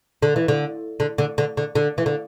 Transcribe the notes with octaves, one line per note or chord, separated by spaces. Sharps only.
D3
E3
D3
D3
D3
D3
D3
D3
E3
D3